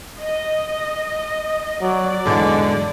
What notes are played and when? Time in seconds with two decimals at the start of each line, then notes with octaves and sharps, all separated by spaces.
0.19 D#5
1.82 F#3 D5
2.26 E2 G#2 D3 F#3 G#3